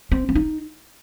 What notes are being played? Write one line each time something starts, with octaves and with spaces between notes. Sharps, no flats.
C4
C4
D#4